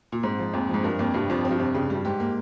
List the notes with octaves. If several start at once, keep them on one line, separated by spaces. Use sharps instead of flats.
A#2
G#2 C4
F3
F2 A#2
F3
G#2
G2 A#4
F2 A#3
G2 C3
F2 F3
C4
G2
F2 C3
G2 C#3
G3
G2
G#2 G4
A#3